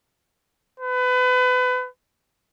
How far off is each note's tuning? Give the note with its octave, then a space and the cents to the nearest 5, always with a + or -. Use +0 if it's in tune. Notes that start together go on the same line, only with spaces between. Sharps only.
B4 +30